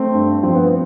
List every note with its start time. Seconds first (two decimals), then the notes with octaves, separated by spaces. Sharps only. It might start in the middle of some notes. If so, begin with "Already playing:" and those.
Already playing: A3 C4
0.13 G2
0.43 F3 C4
0.55 B3